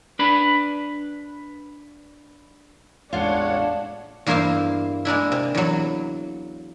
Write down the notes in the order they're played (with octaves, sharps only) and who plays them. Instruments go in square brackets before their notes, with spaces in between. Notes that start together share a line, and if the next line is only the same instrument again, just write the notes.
[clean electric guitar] D4 B4 B5
[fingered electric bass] A1 E2 G#3 [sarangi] D4 [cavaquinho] F4 F5 [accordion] C#5 F#5
[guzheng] E2 G2 A#3 E4 C5 F5
G#3 A#3 D4 E4
C3
E2 F#3